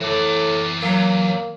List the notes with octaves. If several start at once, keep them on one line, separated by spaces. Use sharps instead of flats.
A2 E3 D5
F#3 A#3